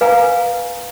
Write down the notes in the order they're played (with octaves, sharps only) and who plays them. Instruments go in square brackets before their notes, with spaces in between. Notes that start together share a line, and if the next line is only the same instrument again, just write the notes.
[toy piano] B4 F5 G#5 A#5